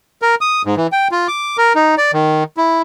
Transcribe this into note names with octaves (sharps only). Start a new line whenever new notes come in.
A#4
D#6
G#2
E3
G5
F4
D6
A#4
D#4
D5
D#3
E4